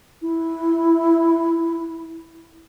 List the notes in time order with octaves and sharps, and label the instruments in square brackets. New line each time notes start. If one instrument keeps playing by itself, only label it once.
[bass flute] E4